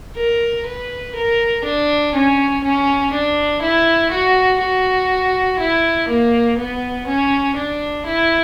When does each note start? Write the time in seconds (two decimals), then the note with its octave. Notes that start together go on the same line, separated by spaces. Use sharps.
0.17 A#4
0.66 B4
1.16 A#4
1.65 D4
2.14 C#4
2.64 C#4
3.13 D4
3.62 E4
4.11 F#4
4.61 F#4
5.60 E4
6.09 A#3
6.59 B3
7.07 C#4
7.57 D4
8.06 E4